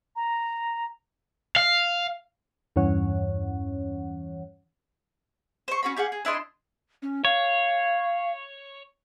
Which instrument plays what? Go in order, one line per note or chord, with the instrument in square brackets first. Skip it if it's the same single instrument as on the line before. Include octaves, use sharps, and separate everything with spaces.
[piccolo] A#5
[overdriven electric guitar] F5
[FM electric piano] E2 G2 E3 C#4 C#5 F#5
[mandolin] C5 C#6
C#4 F#4 B5
G4 G#4 F5 F#5
G#4
D4 E4 D#5 C6
[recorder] C#4
[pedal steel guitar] C#5 [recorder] F5